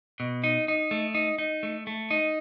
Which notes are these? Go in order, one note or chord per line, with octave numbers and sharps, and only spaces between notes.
B2
D#4
D#4
A3
D#4
D#4
A3
A3
D#4